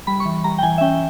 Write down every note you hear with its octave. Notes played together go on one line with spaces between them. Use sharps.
G3 B5
C#6
E3
G3 A#5
G5
E3 G#5
E5
C#4 G5